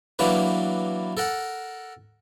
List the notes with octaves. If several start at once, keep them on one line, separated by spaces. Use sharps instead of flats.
E3 F#3 A#3 D4 B4
A4 A#4 F#5